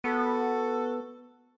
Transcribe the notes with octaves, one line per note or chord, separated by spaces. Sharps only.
B3 F#4 A4